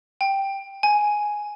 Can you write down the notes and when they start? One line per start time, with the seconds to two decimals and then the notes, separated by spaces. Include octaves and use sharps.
0.21 G5
0.83 G#5